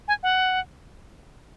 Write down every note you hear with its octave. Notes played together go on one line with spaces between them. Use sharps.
G#5
F#5